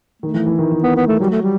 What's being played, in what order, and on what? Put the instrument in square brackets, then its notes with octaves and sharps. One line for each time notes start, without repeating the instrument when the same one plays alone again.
[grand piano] D#3 [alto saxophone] A3
[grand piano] E3
E3
D#3
E3
[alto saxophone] B3
B3
A3
[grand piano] F#3 [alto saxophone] G3
[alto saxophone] A3
G3